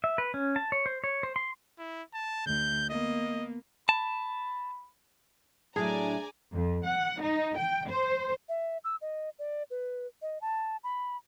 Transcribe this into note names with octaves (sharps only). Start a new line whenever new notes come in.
E5
B4
C#4
A5
C#5
C5
C#5
C5
C6
E4
A5
D2 G6
A#3 B3 D#5
A5 B5
A2 F#3 D4 E4 G#4 D5 G#5 A#5
F2
F#5
D#4
G5
C5
E5
E6
D#5
D5
B4
D#5
A5
B5